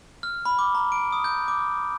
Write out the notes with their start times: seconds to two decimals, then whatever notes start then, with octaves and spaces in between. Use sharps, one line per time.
0.23 F6
0.45 B5
0.59 D6
0.75 A#5
0.92 D7
1.12 D#6
1.24 G6
1.48 D6